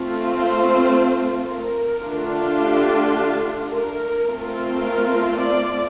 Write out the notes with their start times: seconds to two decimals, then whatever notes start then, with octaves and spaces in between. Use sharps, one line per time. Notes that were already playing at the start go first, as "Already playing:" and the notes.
Already playing: A3 C4 F4
0.35 C5
1.46 A#4
2.02 D3 A3 D4 F4
2.58 G4
3.69 A#4
4.25 A3 C4 F4
4.80 A#4
5.36 D5